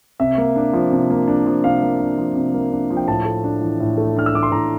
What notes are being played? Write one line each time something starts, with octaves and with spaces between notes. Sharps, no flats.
C3 E5
A#3
D4
F3
C3
A#3
D4
F3
C3 F5
A#3
D4
F3
C3
A#3
D4
F3
G5
A2 A5
A3
D4
E3
A2
A3
D4 F6
E6
E3 D6
C6
A2 A#5